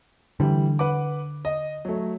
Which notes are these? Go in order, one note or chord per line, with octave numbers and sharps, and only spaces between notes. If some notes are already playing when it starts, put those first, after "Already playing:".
D3 E3 G3
B4 F#5 D6
D#5
F#3 A3